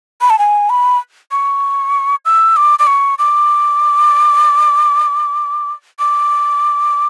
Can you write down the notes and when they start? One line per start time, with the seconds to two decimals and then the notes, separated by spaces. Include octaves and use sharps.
0.21 B5
0.30 A5
0.39 G#5
0.70 B5
1.31 C#6
2.25 E6
2.56 D6
2.79 D6
2.87 C#6
3.18 D6
5.99 D6